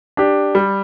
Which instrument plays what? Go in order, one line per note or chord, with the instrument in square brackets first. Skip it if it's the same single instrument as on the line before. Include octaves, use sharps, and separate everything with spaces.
[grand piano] D4 G4
G3